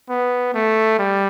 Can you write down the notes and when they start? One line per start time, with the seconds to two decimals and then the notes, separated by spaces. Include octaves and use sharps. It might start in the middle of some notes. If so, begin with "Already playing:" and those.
0.09 B3
0.54 A3
0.99 G3